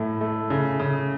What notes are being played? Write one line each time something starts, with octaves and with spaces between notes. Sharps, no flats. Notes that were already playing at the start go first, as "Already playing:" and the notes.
Already playing: A2 A3
A3
C#3
C#3